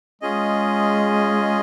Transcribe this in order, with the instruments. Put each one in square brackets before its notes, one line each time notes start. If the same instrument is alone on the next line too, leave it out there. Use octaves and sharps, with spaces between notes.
[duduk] G#3 [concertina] C#4 F4 G#4 D#5